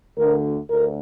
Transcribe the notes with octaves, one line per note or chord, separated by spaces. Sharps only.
D2 D3 A#4
D2 A#4